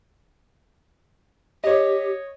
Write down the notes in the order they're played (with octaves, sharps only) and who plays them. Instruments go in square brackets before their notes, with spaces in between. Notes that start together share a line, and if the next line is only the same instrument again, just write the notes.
[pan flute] G4 [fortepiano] C#5 D#5